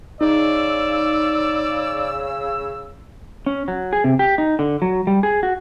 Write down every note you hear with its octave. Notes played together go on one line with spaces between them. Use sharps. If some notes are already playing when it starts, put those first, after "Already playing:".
C#3 D#4 D5 E6
C#4
F#3
G#4
C3
G4
D#4
D3
F#3
G3
G#4
F#4